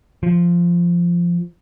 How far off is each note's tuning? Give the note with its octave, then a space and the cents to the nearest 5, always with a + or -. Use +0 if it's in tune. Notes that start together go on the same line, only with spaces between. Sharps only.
F3 -10